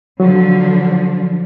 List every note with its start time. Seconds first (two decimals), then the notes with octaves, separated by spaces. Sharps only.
0.20 D3 F3 F#3